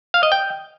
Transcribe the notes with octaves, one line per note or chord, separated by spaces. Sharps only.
F5
D#5
G5